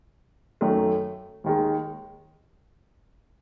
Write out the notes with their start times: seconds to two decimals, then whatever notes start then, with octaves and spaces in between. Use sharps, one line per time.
0.61 F#2 D#3 A3
1.44 D#2 D#3 G#3